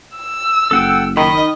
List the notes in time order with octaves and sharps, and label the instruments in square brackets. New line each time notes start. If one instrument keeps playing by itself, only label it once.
[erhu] E6
[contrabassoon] F#1 [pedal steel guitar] A4 F#5 G5
[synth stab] D#3 [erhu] D#5 [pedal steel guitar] B5